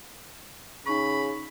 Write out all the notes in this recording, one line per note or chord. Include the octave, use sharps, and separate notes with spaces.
C#3 D#4 B5 C#6